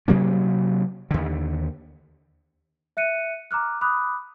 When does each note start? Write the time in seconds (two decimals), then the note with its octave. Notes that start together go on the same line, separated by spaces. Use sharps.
0.08 C3 F#3 A#3 C#4
1.11 D#2 D3
2.97 E5 F#6 C#7 D#7
3.51 A#5 D6 F6 F#6
3.81 B5 D6 D#6 F#6